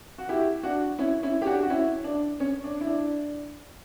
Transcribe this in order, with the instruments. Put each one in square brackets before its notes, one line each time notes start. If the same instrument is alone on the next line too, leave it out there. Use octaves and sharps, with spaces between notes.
[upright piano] F#4
E4 G4
D4 F#4
C#4 E4
C#4 E4
G4
D4 F#4
F#4
C#4 E4
D4
C#4
D4
E4
D4